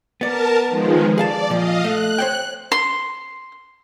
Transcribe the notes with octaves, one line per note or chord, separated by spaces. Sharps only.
B3 A#4 D5 A5
D#3 F3 G#3
G#4 D5 F5 A5
A#2 F3 D#5 F5
A3 F#6
C5 C#5 G5
C6